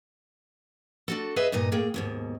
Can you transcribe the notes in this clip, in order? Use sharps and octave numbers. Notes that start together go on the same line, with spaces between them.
D4 F#4 A4
G#4 B4 D#5 E5
G2 A#2 D#4 D#5
A2 A#3 G#4 G5
D#2 G#2 B2